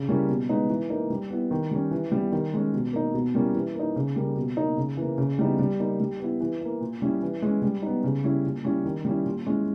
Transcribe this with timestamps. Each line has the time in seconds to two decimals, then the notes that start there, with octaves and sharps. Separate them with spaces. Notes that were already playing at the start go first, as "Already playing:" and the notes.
Already playing: C#3
0.09 G3 A#3 C#4 E4
0.29 B2
0.49 G#3 B3 D#4
0.69 E3
0.90 A#3 D#4
1.10 G3
1.30 B3 E4
1.51 D#3
1.71 G3 C#4
1.91 E3
2.12 G3 B3 E4
2.32 D#3
2.54 G#3 C#4
2.74 B2
2.93 A#3 D#4
3.14 B2
3.35 G3 A#3 C#4 E4
3.54 E3
3.75 A#3 D#4
3.96 C#3
4.16 G3 A#3
4.37 B2
4.57 A#3 D#4
4.77 C#3
4.97 E3 A#3
5.18 C#3
5.38 E3 G3 B3 D#4
5.59 G3
5.79 A#3 D#4
6.00 G3
6.20 B3 E4
6.41 E3
6.61 A#3 E4
6.80 A#2
7.02 G3 C#4 E4
7.22 E3
7.42 G#3 C#4 E4
7.62 G3
7.83 B3 D#4
8.04 C#3
8.24 G3 C#4 E4
8.45 A#2
8.65 G3 C#4 E4
8.85 D#3
9.05 G3 C#4 E4
9.25 A#2
9.46 G#3 C#4 E4